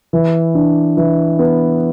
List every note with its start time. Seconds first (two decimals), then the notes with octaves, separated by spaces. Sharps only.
0.13 E3
0.55 D4
0.97 E3
1.39 B3